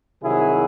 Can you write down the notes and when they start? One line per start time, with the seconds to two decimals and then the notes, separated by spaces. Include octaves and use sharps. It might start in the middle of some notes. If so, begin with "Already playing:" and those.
0.23 C2 C3 D#3 F#3 E4 G#4